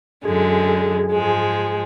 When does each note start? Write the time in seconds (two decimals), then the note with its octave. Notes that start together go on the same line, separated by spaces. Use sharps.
0.24 F#2 D3 G#3 G#4
1.11 G#2 F3 G#3